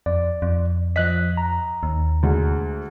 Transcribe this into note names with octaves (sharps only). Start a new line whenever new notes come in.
F2 D5
F2
F3 D#5 F#6 B6
A#5
D#2
D2 G#3